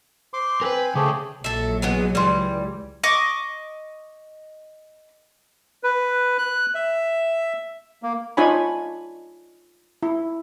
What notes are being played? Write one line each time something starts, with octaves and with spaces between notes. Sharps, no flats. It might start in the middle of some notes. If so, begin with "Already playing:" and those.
C5 C6 D6
C4 A#4 B4 G#5
C#3 A3 G4 G#4
A#1 F#3 A4 E5
E3 G#3 B3
C#2 E3 G3 D5 C6
D#5 C#6 D6
B4
F#6
E5
A#3
D4 D#4 F4 C#5 G#5 B5
E4